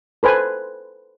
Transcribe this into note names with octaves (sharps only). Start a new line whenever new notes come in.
A4 B4 C5 G#5